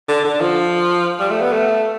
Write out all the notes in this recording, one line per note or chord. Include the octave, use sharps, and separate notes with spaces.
D3
D3
F3
G3
A3
B3
A3